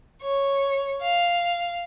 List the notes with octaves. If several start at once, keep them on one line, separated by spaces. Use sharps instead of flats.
C#5
F5